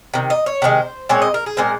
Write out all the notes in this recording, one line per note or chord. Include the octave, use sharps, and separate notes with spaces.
C3 D#3
D#5
C#5
C3 D#3 G#3 C5
A#2 G#3 C4 C#5
D#5
A#4
G#4
A#2 G#3 C4 A#4